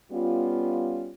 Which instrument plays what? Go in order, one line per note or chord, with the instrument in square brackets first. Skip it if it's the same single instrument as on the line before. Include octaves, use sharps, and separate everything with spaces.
[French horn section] G3 B3 C#4 F4